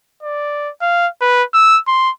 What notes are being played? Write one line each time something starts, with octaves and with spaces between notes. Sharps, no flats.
D5
F5
B4
E6
C6